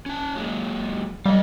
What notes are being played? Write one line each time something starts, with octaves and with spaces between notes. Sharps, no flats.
C#4 A5
F#3 G#3 A#3
G3 A4 D#5 F5